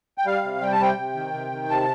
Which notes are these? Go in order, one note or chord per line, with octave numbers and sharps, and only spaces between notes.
G5
G3 F5
C3
G3 G5
A5
C3 G5
C3
D#3
C3
D#3
C3 A5